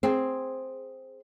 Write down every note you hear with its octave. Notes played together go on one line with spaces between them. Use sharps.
C4 G#4